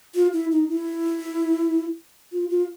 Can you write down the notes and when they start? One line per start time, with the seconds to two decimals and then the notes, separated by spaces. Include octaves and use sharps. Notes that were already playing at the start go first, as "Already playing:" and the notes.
0.15 F4
0.33 E4
0.52 D#4
0.70 E4
2.32 F4
2.50 F4